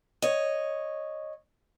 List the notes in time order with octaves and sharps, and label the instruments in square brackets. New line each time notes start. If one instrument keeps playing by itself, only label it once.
[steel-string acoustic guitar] C#5 D#5